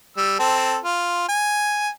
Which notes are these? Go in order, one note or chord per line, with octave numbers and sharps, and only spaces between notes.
G3 E6
C4 A4
F4
G#5